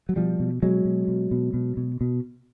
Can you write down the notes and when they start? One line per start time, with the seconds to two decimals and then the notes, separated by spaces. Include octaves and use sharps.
0.09 F#3
0.16 B2 F3 G3
0.40 B2
0.63 B2 F#3 G#3
0.85 B2
1.08 B2
1.31 B2
1.54 B2
1.77 B2
2.01 B2